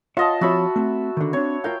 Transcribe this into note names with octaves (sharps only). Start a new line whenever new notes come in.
F4 C#5 D#5 E5 F#5 A5
F3 C4 F#4 C#5 E5 B5
A3 C4
D3 D#3
C4 D4 C#5
F4 A#4 F5 G5